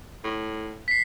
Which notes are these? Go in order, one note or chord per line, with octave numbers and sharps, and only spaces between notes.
A2
B6 C7